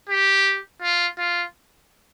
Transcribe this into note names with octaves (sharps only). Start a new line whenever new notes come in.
G4
F4
F4